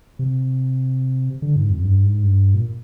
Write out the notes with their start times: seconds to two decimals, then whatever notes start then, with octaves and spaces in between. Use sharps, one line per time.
0.19 C3
1.42 D3
1.56 G#2
1.70 F2
1.83 G2
2.04 G#2
2.23 G2
2.54 A#2